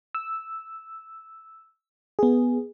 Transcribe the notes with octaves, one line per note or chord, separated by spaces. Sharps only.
E6
B3 G#4